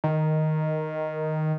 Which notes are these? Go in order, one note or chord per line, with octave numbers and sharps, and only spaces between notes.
D#3